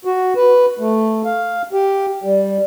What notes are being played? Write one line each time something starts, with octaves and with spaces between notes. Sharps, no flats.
F#4
B4
A3
F5
G4
G3